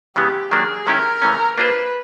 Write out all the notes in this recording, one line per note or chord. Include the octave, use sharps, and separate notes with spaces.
C#3 E3 G#3 B3 G4
D#3 F#3 A#3 D4 G#4
D#3 G#3 C#4 E4 G4 A#4
C#3 E3 A3 C#4
A#3 D4 F4 G#4 B4 C5